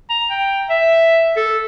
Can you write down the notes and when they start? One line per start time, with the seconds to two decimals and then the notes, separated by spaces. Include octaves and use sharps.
0.10 A#5
0.30 G5
0.70 E5
1.36 A4